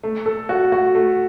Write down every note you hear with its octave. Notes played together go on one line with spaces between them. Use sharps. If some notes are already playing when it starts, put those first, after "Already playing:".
A3
A4
F#4
F#4
A3